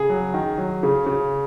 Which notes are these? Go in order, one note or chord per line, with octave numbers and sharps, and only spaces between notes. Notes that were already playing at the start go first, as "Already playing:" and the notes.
Already playing: C#3 G#4
F#3
D#3
F#3
C#3
C#3